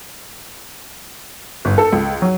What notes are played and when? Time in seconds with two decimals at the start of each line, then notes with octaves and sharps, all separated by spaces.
1.65 G1
1.78 A4
1.93 C#2
2.22 F#3